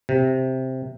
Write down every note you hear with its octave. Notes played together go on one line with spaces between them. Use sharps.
C3